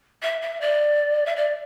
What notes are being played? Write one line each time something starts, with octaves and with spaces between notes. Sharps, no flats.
E5
E5
D5
E5
D5